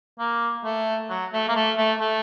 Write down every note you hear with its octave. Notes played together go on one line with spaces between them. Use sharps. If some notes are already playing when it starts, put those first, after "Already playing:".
A#3
A3
F#3
A3
A#3
A3
A3
A3